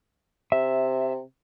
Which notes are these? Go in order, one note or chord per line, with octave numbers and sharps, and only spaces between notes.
C3 E5